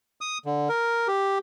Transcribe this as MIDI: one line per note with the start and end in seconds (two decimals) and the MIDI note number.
0.21 0.38 87
0.45 0.69 50
0.69 1.08 70
1.08 1.38 67